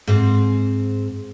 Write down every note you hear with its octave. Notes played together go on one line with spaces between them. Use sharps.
G#2 C4